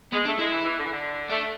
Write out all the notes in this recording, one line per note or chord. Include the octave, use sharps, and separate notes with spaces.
G#3 B3
A3 D4
G#3 E4
E3
E3
D3
E3
D3
A3 D4